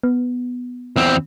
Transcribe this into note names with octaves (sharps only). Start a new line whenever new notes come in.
B3
E2 C4